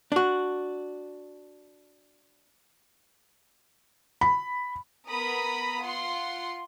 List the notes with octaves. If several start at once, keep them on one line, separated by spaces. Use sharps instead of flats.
D4 F#4
B5
B3 A#4 A#5 B5 D#6
F4 F#5 C6